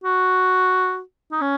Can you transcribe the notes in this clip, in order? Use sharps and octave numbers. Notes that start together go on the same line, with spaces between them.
F#4
D#4
C#4